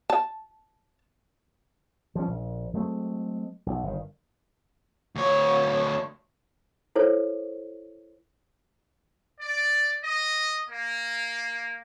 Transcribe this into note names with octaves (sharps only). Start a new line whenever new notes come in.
A5
F3 G3 G#3 C#4
A#1
F#3 G#3 A3 C4
B1
G1 D#3
D2 C#5
E4 A4 A#4 C5 C#5
D5
D#5
A#3